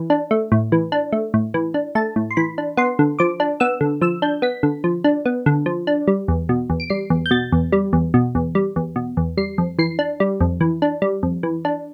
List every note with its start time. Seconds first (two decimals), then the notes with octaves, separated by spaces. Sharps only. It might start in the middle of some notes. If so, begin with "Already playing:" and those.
Already playing: E3
0.10 D4
0.31 A3
0.52 A2
0.72 E3
0.92 D4
1.12 A3
1.34 A2
1.54 E3
1.74 D4
1.95 A3 A5
2.16 A2
2.31 C6
2.37 E3 B5
2.58 D4
2.77 B3 C6
2.99 D3
3.19 F3 D6
3.40 D4
3.60 B3 E6
3.81 D3
4.01 F3 E6
4.22 D4 G6
4.42 B3 B6
4.63 D3
4.84 F3
5.04 D4
5.26 B3
5.46 D3
5.66 F3
5.87 D4
6.07 G3
6.28 E2
6.49 B2
6.70 E2
6.80 D7
6.90 G3 C7
7.10 E2
7.26 G6
7.31 B2 A6
7.52 E2
7.72 G3
7.93 E2
8.14 B2
8.35 E2
8.55 G3
8.76 E2
8.96 B2
9.17 E2
9.37 G3 C7
9.58 F2
9.79 E3 C7
9.99 D4
10.20 G3
10.41 F2
10.61 E3
10.82 D4
11.02 G3
11.23 F2
11.43 E3
11.65 D4